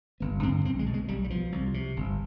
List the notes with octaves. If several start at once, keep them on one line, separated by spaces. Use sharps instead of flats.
G1 B3
G2 D3 C4
B1 C4
G#3
B2
G#3
B1 G3
G3
B2 F3
C2
C3
G1